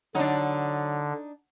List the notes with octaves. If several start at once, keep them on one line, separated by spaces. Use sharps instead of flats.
D3 F#3 D4 D#4